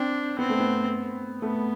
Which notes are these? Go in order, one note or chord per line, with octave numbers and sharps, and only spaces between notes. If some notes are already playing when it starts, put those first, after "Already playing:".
Already playing: C4 D4
B3 C4
A3
B3
A3 B3